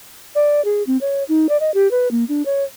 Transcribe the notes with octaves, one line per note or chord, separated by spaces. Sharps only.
D5
G#4
C4
C#5
D#4
D5
D#5
G4
B4
A#3
D4
C#5